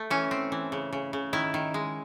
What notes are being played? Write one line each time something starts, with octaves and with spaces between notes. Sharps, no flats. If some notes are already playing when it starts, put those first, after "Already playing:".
Already playing: A3
E3 C#4
C4
E3
C#3
C#3
C#3
D#3 E4
D#3
G#3